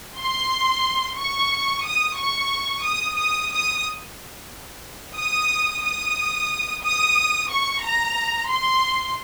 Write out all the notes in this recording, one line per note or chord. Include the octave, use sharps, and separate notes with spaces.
C6
C#6
D#6
C#6
D#6
D#6
D#6
D#6
D#6
D#6
C#6
A#5
C6